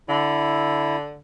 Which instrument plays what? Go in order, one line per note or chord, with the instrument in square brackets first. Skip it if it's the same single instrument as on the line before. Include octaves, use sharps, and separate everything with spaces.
[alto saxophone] D3 [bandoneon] E4